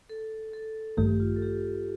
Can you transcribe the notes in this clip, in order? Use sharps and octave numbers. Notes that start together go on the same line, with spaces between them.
A4
A4
A1 G2 D#3 A3 G4
F4
A4
G4